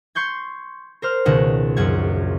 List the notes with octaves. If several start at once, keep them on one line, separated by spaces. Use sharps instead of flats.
C6 C#6 G6 G#6
A#4 C5 F6
C#2 B2 D#3 F#5
A#1 F#2 F#3 F#5 G#6